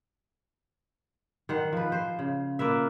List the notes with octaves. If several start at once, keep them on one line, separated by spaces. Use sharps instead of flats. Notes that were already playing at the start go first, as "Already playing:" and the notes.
D#3 C5 F#5
F3 B4
C5
C#3
A#3 F4 B4 E5